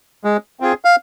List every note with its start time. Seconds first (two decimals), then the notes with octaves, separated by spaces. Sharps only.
0.24 G#3
0.60 C4 F4 G#4
0.85 F5